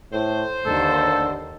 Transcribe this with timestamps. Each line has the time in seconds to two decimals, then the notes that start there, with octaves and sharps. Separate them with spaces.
0.13 A2 C5
0.66 D#2 D3 A4